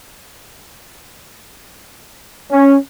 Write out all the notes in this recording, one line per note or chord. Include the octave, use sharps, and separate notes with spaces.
C#4